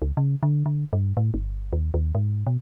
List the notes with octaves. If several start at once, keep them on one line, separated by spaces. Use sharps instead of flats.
C#2
C#3
D3
D3
G2
A2
G1
D#2
D#2
G#2
B2